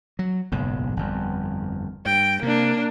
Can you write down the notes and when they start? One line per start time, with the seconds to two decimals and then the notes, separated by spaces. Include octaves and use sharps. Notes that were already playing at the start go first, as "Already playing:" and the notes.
0.19 F#3
0.52 F#1 B1 G#2
0.97 G1 F2
2.06 G2 G5
2.43 C3 A#3 D4